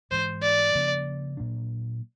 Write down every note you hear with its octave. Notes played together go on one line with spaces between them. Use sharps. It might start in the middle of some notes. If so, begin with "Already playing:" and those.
G#2 E3 G#3 C5
D5
C#3 F3 A#3 C#4
A#2 F#3 A#3 D4